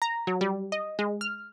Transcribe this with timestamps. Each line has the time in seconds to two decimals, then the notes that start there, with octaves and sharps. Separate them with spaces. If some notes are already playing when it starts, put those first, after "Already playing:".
0.02 A#5
0.27 F#3
0.41 G3
0.72 D#5
0.99 G#3
1.21 F6